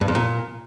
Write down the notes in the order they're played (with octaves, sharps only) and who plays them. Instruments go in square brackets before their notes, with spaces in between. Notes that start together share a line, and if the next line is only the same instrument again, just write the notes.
[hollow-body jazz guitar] G2
F2
A#2